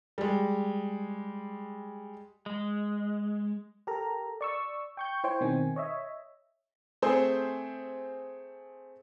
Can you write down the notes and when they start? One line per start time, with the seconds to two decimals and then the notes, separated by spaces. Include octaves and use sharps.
0.18 G3 G#3
2.46 G#3
3.87 G4 A4 A#4 A#5
4.41 D5 C#6 E6
4.97 G5 C#6 G6
5.24 E4 C5 C#5 G5
5.41 B2 D#3 C4 G#5
5.76 C#5 D#5 E5
7.02 A3 C4 G#4 C5